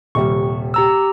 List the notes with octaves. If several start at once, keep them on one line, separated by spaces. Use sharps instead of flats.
D#1 C3 G3 C#6
G4 A#5 E6